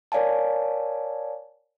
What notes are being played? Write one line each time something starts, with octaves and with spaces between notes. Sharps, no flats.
A#4 C#5 D5 F5 G#5 A5